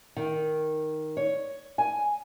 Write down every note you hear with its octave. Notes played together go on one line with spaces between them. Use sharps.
D#3
C#5
G#5